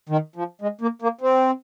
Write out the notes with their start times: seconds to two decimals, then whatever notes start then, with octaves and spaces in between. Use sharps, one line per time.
0.09 D#3
0.36 F3
0.61 G#3
0.81 A#3
1.02 A#3
1.21 C4